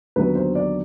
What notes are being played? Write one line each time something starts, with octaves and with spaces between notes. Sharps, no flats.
D#2 D3 F#3 B3 B4
C5
D5